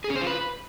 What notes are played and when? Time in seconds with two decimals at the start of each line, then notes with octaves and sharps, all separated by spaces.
0.04 G#4
0.10 C#4
0.16 C5
0.21 F4
0.27 B4